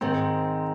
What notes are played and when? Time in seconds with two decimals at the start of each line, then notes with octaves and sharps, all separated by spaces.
0.01 G#2 D#3 G#3 C4